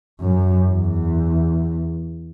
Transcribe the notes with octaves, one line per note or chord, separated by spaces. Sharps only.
F#2
E2